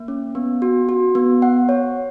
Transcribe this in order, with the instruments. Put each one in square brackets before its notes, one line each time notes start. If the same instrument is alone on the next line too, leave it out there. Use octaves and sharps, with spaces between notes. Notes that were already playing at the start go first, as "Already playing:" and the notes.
Already playing: [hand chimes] A#3
C#4
B3
F#4
F#4
B3
F#5
C#5